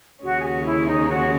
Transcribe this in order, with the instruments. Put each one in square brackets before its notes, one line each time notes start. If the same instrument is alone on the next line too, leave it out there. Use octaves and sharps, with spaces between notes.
[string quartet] D#2 C#3 G#3 C#4 [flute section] F#4
[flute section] G#4
F#4
F#4
E4
D#4
F#4